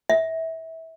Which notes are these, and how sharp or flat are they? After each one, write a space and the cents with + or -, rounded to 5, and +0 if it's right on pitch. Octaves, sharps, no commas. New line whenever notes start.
E5 -25